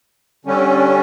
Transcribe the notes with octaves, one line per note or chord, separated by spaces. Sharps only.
D3 G3 C#4